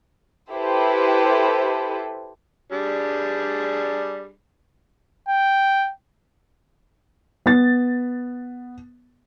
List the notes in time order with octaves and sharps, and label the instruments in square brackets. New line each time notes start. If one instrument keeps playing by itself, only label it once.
[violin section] E4 G4 A4 B4 C5
[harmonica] G3 D4 G#4
[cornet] G5
[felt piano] B3 A6